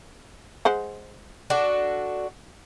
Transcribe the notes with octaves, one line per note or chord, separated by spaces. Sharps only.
G#3 C5 F#5
D4 F#4 A4